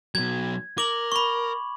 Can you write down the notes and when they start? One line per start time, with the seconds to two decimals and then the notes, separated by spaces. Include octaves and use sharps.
0.15 B2 F#3 G#6
0.78 A#4 D6 F#7
1.12 B5 C#6